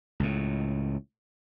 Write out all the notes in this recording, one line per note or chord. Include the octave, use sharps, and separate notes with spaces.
C#2 A2